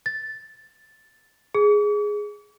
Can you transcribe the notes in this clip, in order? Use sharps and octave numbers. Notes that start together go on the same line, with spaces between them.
A6
G#4